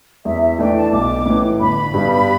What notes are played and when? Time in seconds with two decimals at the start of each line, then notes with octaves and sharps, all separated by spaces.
0.25 E2 E5
0.41 E5
0.59 E3 A3 D4 G5
0.76 A5
0.92 B1 D6
1.26 A2 E3
1.60 G1 B5
1.94 G2 G3 B3 D4